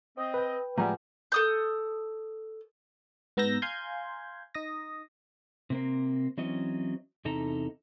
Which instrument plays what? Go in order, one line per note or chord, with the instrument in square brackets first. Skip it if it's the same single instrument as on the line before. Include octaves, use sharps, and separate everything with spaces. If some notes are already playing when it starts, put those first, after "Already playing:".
[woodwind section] C4 D#5
[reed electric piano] B4 G5
[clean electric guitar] A2 F3 G#3 [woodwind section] G3 [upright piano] F#5 G#5 A#5
[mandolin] A4 D#6 G6
[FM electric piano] G#2 B3 A#5 E6 G6 A#6
F5 G#5 A#5 C6 G6 G#6
D#4 D#6 A#6
[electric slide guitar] C3 A#3 C4
E3 F#3 C4 C#4 D#5
E2 C3 D#4 A4 A#5